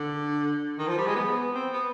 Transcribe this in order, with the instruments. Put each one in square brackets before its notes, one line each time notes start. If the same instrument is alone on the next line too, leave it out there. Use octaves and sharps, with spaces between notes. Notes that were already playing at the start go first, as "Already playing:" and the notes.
Already playing: [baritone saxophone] D3
D#3
F3
G3
G#3
B3
C4
B3